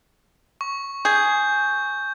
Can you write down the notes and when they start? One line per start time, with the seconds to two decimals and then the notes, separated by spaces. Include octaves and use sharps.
0.61 C#6
1.05 G#4 G6